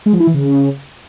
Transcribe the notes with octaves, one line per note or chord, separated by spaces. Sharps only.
G#3
F3
E4
E3
C#3